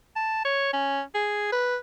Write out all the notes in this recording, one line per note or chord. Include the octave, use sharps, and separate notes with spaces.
A5
C#5
C#4
G#4
B4